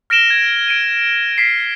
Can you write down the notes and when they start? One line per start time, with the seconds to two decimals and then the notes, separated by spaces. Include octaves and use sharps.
0.10 F6 A#6 D7 E7 G7
0.30 G#6
0.68 D7 D#7
1.38 B6 C7